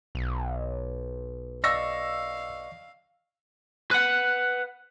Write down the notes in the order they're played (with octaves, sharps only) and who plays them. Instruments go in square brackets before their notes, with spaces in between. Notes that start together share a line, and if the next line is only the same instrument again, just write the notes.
[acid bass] B1
[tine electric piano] D5 D#5 C#6 [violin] F5 [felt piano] E6 A#6
[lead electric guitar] B4 F#5